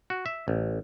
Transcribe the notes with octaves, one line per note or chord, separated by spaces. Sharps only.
F#4
E5
A1